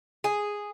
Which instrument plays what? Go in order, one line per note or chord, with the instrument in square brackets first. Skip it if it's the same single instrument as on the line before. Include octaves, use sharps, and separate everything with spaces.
[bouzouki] G#4